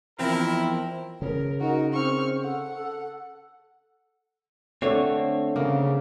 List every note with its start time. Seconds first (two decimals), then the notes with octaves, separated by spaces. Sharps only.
0.19 E2 F3 C4 E4 A#4 G5
1.22 C#3 A#4
1.60 D#4 F#4 A#4
1.93 C4 C#6 F6
2.42 A4 F#5
2.75 A4
4.82 D3 A3 C4 C#5
5.56 C#3 A#3